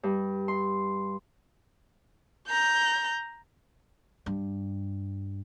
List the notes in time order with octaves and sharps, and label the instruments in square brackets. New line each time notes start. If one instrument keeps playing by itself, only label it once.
[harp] G2
C6
[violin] A#5 G6
[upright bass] G2